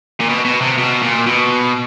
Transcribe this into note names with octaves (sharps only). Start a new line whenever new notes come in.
A#2
B2
B2
C3
B2
A#2
B2